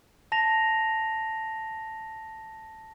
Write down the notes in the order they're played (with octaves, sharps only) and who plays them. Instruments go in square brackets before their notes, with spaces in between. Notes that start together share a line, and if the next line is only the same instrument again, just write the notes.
[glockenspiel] A5 A#6 F7